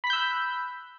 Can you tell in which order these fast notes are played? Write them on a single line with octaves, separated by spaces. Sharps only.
B5 B6 G6 E6 F#6